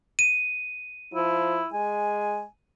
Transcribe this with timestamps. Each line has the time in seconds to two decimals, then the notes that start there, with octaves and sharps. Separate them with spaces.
0.19 D#7
1.14 F3 E4
1.73 G#3 G#5